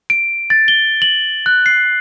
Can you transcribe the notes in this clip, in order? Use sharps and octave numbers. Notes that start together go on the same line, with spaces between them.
D7
A6
G7
F#7
F#6
C7